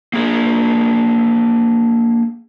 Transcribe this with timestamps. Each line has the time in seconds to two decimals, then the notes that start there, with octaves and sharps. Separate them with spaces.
0.13 A#3 D4 G#4